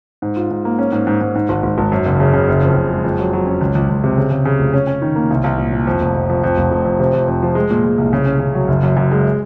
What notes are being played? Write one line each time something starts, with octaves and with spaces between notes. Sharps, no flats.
G#2
F4
G#2
A#3
C#4
G#2
G#2
G#2
G#2
G#1
G#1
G#1
F#2
F#1
C#3
C#3
F#1
F2
F#1
G#3
F2
F#3
F#3
C#4
C#2
C#2
C#2
C3
C#3
C#3
C#3
F1
C#4
C#4
D#3
A#3
C2
C2
A#2
A#2
F2
F1
F2
F2
F2
F1
F1
F2
C3
F2
F2
F3
G#3
A#2
G#3
C2
C#3
C#4
C#3
F#3
F#1
F#2
F#2
G#3